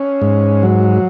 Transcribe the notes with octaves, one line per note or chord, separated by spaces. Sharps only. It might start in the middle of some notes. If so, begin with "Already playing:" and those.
Already playing: C#4
G#2
F#3